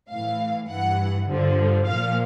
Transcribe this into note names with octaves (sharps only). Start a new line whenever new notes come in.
A2 E3 F5
G2 E3 F#5
G2 D3 F3
A#2 F3 F5